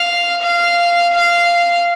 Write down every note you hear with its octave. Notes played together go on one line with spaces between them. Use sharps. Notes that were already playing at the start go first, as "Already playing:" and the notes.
Already playing: F5
F5
F5